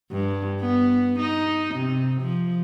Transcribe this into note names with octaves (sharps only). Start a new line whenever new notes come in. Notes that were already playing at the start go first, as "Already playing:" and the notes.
G2
B3
D#4
C3
F3